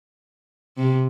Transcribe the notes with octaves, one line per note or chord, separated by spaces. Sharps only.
C3